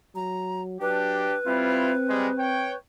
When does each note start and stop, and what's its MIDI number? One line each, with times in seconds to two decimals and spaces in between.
0.15 0.78 54
0.15 0.63 82
0.81 1.33 54
0.81 1.35 62
0.81 1.35 67
0.81 2.76 71
1.47 1.93 55
1.47 2.74 60
1.47 1.93 64
1.47 1.93 65
2.09 2.29 55
2.09 2.29 56
2.39 2.73 73
2.39 2.73 79